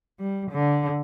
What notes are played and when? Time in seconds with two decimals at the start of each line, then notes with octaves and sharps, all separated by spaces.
0.20 G3
0.51 D3